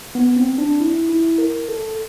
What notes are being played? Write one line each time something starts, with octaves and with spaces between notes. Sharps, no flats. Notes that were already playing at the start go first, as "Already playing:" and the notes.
B3
C4
D4
E4
E4
A#4
A4